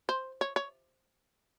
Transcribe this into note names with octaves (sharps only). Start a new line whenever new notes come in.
C5
C#5
C#5